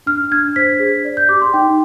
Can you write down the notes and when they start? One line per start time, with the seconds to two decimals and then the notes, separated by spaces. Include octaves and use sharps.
0.06 D4 F6
0.31 D4 G#6
0.56 C5 B6
0.80 G#4
1.05 D5
1.17 G6
1.29 G4 D6
1.41 C6
1.53 D#4 G5